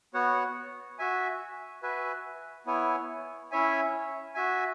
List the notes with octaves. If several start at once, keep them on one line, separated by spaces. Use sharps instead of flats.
B3 F#4 C#5 F#5
F#4 E5 G#5
F#4 B4 E5 G#5
B3 E4 C#5 G#5
C#4 E4 C#5 E5 G#5
F#4 E5 G#5